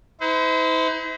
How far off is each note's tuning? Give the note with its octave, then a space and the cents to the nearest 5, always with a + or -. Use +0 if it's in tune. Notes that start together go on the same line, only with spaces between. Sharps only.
E4 -45 C5 -40